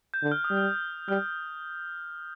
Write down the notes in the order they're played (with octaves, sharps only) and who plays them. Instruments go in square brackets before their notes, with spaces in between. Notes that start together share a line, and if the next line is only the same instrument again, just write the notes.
[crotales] G6
[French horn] D3
[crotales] F6
D#6
[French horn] G3
[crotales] F6
[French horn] G3 [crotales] F6